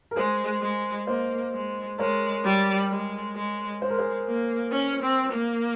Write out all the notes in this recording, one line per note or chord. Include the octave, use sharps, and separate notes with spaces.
A#4
G#3 G#4 C5
G#3
A#3 C5 D#5
G#3
G#3 A#4 C#5
G3
G#3
G#3
G#3 C5
A#4
G#4 C5
A#3
C#4
C4
A#3